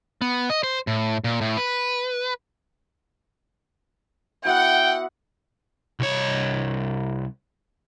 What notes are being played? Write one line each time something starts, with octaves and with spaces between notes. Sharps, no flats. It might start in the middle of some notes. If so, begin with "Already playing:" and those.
B3
D#5
C5
A2
A#2
A2
B4
B3 E4 F#4 F#5 G5
C2 C#5